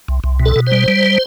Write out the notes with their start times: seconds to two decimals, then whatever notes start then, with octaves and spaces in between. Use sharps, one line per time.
0.08 C2
0.24 C2
0.40 B2
0.45 A4
0.56 B2
0.67 C5
0.72 G3
0.88 G3